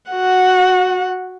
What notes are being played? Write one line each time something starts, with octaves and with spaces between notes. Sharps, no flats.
F#4 F#5